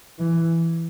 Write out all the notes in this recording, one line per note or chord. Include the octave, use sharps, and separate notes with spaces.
E3